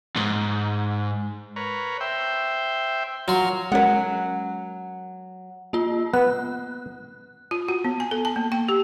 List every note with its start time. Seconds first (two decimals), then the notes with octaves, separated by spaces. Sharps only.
0.16 D#2 G#2
1.56 A#4 B4 C#5
2.00 C5 E5 G5
3.28 F#3 F4 A#4 C#5 C6
3.72 F#3 G#3 C#4 A#4 F#5
5.73 A#3 F4
6.14 B3 F#6
7.51 F4
7.68 F#4
7.85 B3
8.00 G#5
8.11 A4
8.25 A5
8.36 A#3
8.52 G5
8.68 G4